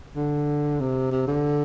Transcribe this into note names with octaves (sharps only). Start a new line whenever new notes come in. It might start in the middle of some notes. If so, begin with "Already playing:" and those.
D3
C3
C3
D3